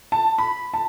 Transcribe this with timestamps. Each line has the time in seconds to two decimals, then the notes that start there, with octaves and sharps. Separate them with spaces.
0.12 A5
0.38 B5
0.74 A5